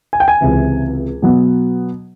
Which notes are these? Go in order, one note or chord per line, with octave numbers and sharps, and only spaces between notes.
G#5
G5
G#5
C#2 C3 E3
B2 F#3 B3